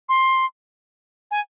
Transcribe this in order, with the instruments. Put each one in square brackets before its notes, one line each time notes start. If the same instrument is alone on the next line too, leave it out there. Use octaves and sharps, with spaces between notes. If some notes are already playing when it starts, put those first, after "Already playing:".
[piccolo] C6
G#5